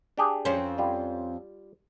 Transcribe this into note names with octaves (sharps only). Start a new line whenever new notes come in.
D4 G4 G#4
F2 C4 C#4
G3 F4